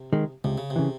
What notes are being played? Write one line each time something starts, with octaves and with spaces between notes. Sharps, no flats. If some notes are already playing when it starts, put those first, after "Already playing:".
Already playing: C3
D#3 G#3
C#2 C3
C#3
C3
C#3 E3